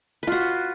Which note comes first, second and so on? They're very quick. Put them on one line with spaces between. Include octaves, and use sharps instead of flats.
B4 F4 F#4